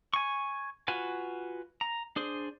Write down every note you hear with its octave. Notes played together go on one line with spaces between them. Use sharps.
G#5 C#6
F4 F#4 B4 G#5
A#5
D4 G#4 C5